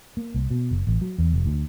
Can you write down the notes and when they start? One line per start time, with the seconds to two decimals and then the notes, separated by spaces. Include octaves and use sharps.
0.17 A#3
0.34 C2
0.51 B2
0.71 F#1
0.87 A1
1.02 F#3
1.18 E2
1.33 F1
1.46 D2